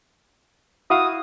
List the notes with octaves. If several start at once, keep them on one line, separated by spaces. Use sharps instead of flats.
E4 F#4 F5 D#6